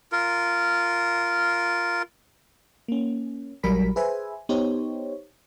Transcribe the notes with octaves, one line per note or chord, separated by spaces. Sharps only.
F4 A#4
A#3 C#4
A#1 F#3 G3 A#4 B5 B6
G#4 B4 C5 E5 G#5
B3 D#4 G4 C5 C#5